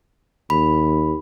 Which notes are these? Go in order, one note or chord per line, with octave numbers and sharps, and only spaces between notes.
D#2 B5